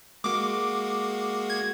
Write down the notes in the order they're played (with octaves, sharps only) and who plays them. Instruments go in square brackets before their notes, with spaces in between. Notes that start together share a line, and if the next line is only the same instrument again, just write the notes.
[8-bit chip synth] G#3 A#3 F#4 [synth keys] D6
[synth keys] G#6